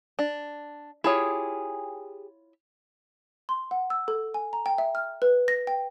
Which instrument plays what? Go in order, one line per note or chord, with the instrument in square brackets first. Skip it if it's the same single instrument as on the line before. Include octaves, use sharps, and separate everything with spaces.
[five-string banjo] D4
[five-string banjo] E4 F4 C#5 [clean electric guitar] G4 G#4
[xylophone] C6
F#5
E6
A4
G#5
A#5
G5
E5
F6
B4
A#6
G5